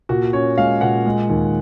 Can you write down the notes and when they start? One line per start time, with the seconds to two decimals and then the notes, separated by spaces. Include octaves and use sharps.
0.09 A#2 F#4
0.33 C#4 C#5
0.58 G#3 F5
0.81 A#2 F#5
1.06 G#3
1.30 D#2